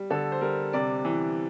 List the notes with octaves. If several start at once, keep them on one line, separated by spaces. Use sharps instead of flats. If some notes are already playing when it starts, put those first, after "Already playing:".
Already playing: G3
D3 A4
C5
G3 A#4
C3 D5
E3